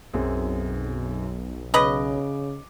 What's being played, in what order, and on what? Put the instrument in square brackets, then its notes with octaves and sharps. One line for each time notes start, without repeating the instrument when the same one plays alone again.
[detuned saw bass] B1 [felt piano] F#2 C4 G#4
[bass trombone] C#3 [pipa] C#4 B4 D#5 [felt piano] D6